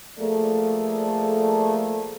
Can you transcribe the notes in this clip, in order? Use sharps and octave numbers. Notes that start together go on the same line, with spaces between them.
F3 A3 A#3 G#4 A4 D5